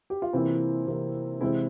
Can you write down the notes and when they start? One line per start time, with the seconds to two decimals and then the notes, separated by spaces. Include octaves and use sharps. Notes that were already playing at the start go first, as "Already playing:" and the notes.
0.10 G4
0.22 F4
0.33 C3 E3 A#3 C4 E4
0.88 C3 E3 A#3
1.41 C3 E3 G#3 C4 E4